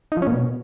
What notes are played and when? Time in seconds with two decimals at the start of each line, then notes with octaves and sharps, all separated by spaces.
0.12 D#4
0.17 F3
0.22 C#4
0.27 A#2
0.32 B2